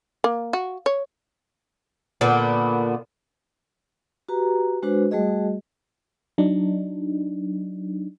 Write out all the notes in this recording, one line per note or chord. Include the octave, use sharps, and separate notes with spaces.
A#3
F#4
C#5
A#2 D3 A#3 B3
F#4 G4 B4 A#5
G#3 D4 F#4 B4 C5
G3 A3 F#4 G#4 D#5
F#3 D4 D#4